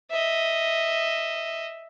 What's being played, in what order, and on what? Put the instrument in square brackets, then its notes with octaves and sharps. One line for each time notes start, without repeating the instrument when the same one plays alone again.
[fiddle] D#5 E5